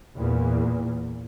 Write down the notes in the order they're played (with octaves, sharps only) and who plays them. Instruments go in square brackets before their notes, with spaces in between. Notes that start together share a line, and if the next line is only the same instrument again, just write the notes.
[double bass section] E2 A#2